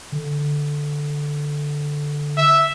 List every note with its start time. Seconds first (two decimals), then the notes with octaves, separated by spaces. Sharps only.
0.12 D3
2.37 E5